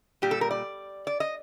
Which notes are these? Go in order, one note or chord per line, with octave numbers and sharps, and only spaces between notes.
A#2 G3 G4
A4
A#4
D5
D5
D#5